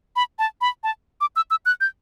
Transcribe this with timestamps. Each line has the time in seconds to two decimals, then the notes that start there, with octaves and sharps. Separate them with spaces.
0.16 B5
0.39 A5
0.61 B5
0.83 A5
1.21 D6
1.36 E6
1.51 E6
1.66 F#6
1.81 G6